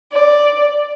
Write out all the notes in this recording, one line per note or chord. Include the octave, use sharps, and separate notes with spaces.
D5